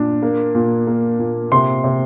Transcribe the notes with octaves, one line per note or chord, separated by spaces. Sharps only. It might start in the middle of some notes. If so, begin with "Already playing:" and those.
Already playing: A#2 D4
A#3
A#2
A#3
A#2
C3 C6
C3